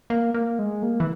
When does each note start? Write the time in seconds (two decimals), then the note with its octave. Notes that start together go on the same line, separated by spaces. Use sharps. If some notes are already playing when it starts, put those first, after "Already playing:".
0.10 A#3
0.34 A#3
0.59 G#3
0.82 A#3
1.00 E3